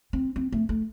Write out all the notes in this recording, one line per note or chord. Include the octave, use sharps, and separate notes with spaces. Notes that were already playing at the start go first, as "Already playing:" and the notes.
C4
C4
A3
A3